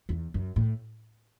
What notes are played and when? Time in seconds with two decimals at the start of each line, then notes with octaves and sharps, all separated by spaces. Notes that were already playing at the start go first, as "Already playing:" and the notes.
0.09 E2
0.34 F#2
0.56 A2